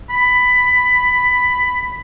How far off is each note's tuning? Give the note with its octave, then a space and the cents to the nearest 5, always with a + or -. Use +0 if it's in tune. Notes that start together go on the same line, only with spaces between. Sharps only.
B5 +10